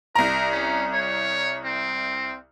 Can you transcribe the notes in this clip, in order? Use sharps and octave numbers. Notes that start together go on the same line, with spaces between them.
C2 A#4 A#5
C#4
C#5
C4